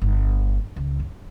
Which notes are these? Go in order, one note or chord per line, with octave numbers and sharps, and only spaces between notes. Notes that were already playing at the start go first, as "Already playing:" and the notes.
G1
C#2
F#2